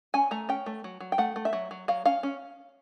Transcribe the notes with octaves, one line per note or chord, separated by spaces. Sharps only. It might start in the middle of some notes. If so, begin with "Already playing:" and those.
C#4 G#5
A3 A#5
C#4 G5
A3
F#3
F#3
G5
A3 F#5
A3
E5
F#3
F#3
F#3 F5
C#4 F5
C#4